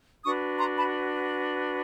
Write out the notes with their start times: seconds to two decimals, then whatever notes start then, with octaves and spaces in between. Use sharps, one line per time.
0.25 D4 F#4 B4 C#6 D#6
0.59 A#5 C6
0.77 A5 B5